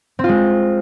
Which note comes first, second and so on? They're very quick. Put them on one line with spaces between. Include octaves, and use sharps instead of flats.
C4 F4 G#3